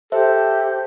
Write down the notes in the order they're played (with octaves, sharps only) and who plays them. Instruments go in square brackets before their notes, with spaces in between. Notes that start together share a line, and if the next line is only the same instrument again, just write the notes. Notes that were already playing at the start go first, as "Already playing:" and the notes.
[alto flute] G4 [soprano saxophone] A4 [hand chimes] C5 E5